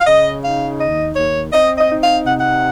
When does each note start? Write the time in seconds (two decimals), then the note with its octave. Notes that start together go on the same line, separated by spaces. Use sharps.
0.01 F5
0.07 C#3 D#5
0.43 D#4 F5
0.80 D#2 D#5
1.16 D#2 C#5
1.53 C4 D#5
1.77 D#5
1.89 D#4
2.01 F5
2.25 C3 F#5
2.40 F#5